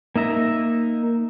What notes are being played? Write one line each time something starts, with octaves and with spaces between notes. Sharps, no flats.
A#3 D#4 E5 A#5